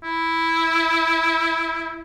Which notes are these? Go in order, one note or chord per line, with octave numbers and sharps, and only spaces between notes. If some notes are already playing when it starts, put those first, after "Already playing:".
E4